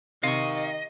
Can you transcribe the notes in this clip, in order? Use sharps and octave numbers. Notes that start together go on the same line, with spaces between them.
C3 D#3 D#5 F5 C#6